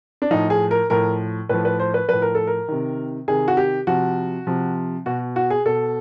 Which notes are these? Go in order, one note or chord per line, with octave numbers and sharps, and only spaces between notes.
D4
A2 F3 D#4
G#4
A#4
A2 F3 A#4
A2 F3 B4
B4
C5
B4
A2 F3 B4
A#4
A4
A#4
C3 D#3
C3 D#3 G#4
F#4
G4
C3 F3 F#4
C3 F3
B2 F#4
F#4
G#4
B2 A4